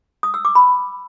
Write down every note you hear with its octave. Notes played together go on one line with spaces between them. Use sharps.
D#6
E6
D6
B5